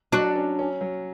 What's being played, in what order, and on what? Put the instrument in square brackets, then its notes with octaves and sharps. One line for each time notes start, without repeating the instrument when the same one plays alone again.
[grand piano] F#3 [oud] D4 F#4
[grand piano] C#4
C#4
F#3